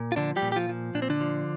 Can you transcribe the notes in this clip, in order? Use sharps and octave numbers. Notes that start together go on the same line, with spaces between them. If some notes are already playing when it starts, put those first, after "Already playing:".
Already playing: A#2
F4
D3 F3 D4
G3 G4
A#2
G4
F3 F4
F3
A#2 D4
C4
D3 D4
F3